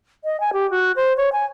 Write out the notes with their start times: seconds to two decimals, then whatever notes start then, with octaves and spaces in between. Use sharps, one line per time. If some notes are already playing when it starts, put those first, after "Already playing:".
0.24 D#5
0.40 G#5
0.53 G4
0.71 F#4
0.96 C5
1.17 C#5
1.33 G#5